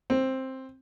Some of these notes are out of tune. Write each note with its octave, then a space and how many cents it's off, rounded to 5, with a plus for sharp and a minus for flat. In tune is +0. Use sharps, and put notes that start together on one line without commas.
C4 +10